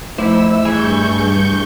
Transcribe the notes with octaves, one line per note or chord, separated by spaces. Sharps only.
F2 A3 D#4 E4 C5 E6
G2 E3 G#4 C#6 G6